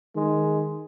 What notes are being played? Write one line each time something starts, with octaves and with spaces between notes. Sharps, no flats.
D#3 G#3